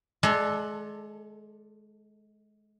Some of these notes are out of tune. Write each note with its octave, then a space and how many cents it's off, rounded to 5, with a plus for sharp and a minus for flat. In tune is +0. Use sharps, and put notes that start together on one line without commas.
G#3 +30 A4 +0 D5 +20